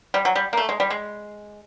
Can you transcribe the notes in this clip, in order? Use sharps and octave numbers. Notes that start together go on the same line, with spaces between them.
G3
F#3
G3
A#3
A3
G#3
G3
G#3